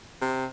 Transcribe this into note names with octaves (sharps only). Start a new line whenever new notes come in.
C3